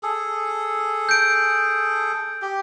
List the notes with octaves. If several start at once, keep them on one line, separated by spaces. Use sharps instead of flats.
G#4 A4
G6 D7
G4